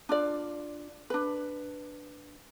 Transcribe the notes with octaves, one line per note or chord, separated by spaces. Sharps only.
D4 F4 D5
D4 B4